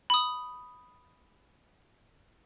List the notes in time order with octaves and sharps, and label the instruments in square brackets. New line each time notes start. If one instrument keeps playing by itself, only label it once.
[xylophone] B5 D#6